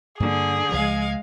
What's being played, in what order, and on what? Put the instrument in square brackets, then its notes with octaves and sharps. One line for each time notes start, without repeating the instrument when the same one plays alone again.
[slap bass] G2 A#3 [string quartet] D3 [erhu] G#4
[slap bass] C#2 F3 [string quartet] G#3 F5 G#6